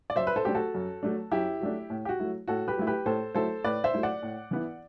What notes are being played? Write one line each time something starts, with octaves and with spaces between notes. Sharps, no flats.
D5
F#2 C5 E5
B4
A4 C5
F#3 A3 D4 G4
F#4 A4
F#2
F#3 A3 D4
F#2 E4 G4
F#3 A3 D4
A2
G4
F#4
F#3 A3 E4
A2 F#4 A4
G4 B4
F#3 A3 E4
G4 B4
A2 A4 C5
F#3 A3 E4 A4 C5
A2 B4 D5
C5 E5
F#3 A3 E4
D5 F#5
A2
E3 B3 E4